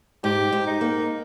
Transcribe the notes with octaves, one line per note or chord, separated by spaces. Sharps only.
G#2 G4
G#2
D#4
A#3